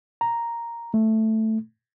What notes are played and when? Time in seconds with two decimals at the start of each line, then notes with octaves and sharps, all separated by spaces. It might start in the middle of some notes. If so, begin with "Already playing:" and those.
0.21 A#5
0.94 A3